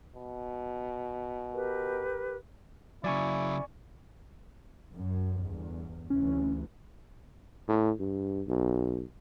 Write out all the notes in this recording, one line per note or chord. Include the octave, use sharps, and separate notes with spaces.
B2
G4 A#4 B4
C#3 F#3 E4 D5 G#5 C#6
F#2
G1 E2
D2 C3 E3 C#4
A2
G2
B1